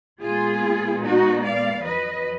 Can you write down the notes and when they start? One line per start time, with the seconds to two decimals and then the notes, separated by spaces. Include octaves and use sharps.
0.21 A#2 G#3 B3 F4 G#4
1.02 D#4 F#4
1.43 D5 F5
1.83 F2 D#3 F#3 B4 D#5